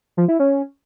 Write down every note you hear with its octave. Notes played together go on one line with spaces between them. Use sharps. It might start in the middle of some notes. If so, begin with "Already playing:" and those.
F3
E4
C#4